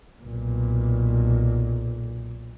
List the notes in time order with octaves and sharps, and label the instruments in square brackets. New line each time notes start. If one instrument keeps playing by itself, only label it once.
[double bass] B1 A#2